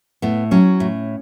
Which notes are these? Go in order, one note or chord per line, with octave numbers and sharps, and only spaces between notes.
A2 B3
F#3 C#4
A2